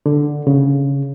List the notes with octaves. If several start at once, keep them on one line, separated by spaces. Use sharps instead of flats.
D3
C#3